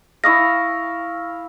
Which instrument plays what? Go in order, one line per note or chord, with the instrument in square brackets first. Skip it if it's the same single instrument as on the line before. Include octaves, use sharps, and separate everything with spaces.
[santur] E4 F5 [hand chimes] C#6 D#6 A#6